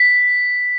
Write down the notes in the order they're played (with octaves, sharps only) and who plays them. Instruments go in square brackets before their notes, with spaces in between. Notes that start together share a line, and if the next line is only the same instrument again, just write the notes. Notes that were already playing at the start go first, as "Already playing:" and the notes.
Already playing: [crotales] B6